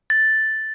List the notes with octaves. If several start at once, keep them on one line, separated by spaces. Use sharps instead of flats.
A6